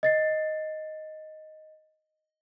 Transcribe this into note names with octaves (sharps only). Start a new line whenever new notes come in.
D#5 A6 C7